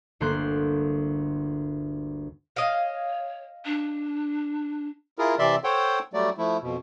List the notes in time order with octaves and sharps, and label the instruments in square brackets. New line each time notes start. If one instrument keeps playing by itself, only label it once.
[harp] G1 D2 A#3 C6 F#6 G6
[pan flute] C#5 [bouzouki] D#5 F5
[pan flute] D4
[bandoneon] E4 F4 G#4 A#4
C3 E3 D5 E5 C6
A4 C5 C#5 F#5 G5 C6
F#3 G3 A3 D5
F3 A3 E4
F2 B2